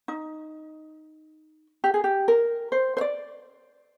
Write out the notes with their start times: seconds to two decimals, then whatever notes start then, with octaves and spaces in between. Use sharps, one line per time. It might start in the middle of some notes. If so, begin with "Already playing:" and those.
0.08 D#4
1.84 G4
1.94 G#4
2.04 G4
2.28 A#4
2.72 C5
2.97 C5
3.01 D5